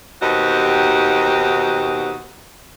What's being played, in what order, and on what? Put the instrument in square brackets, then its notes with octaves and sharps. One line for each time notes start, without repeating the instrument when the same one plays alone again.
[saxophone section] D#2 B2 C4 D#4 F#4 G4